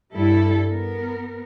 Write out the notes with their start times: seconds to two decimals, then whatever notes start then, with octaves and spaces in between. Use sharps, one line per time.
0.12 G2 G3 E4 A4
0.66 B3 A#4